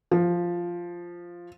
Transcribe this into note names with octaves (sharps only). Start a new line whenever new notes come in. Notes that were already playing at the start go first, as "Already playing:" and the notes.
F3